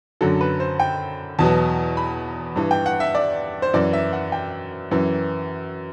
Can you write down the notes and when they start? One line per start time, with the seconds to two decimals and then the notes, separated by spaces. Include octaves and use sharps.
0.21 F#2 D3 F#3 A4
0.41 B4
0.60 C5
0.80 G5
1.39 E2 B2 F#3 A5
1.97 B5
2.56 G2 E3
2.71 G5
2.86 F#5
3.00 E5
3.15 D5
3.62 C5
3.74 F#2 E3 D5
3.93 E5
4.13 F#5
4.32 G5
4.91 F#2 E3